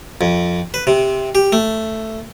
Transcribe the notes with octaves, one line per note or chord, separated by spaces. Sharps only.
F2
B4
C3
G4
A3